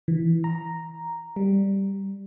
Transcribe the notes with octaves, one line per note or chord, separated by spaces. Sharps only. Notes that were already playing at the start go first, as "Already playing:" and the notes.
E3
A#5
G3